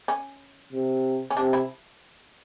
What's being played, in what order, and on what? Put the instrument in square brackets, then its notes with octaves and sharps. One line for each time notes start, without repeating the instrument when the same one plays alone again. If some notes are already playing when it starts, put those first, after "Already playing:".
[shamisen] C#4
[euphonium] C3
[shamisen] C#4
[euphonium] C3 [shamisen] D4
[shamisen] E4